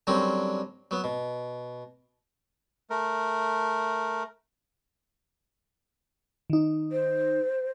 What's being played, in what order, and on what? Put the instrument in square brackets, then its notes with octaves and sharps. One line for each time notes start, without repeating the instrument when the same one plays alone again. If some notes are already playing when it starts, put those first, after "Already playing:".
[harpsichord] D3 F#3 G3 C4 C#4 A#4
F#3 B3
B2
[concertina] A3 A#4
[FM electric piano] D#3 D#4
[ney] C5